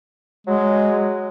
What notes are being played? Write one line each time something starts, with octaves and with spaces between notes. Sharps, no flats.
F#3 G#3